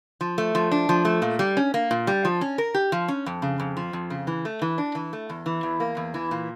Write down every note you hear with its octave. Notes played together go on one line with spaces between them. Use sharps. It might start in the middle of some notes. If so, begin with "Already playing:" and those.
F3
A3
F3
D4
F3
A3
A#2
G3
C#4
A#3
A#2
G3
F3
C#4
A#4
G4
F3
C#4
F2
C#3
F2
F3
F2
C#3
E3
A3
E3
D4
E3
A3
E2
E3
E2
A#3
E2
E3
A#2